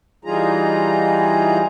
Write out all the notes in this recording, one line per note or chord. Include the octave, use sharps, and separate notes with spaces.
E3 G3 D#4 F4 G#4 A#5